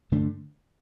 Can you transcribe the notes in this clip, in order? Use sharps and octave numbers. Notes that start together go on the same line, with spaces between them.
G2 D3 A3 D4